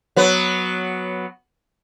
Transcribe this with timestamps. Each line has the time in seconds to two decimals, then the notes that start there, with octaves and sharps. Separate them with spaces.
0.16 F#3 B3